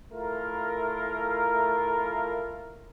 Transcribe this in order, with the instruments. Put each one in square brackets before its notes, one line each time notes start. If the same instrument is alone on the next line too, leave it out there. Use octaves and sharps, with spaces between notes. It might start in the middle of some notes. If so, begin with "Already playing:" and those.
[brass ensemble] A3 E4 F4 A#4